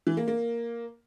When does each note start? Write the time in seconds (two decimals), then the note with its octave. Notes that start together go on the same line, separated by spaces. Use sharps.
0.07 E3
0.17 A#3
0.28 A#3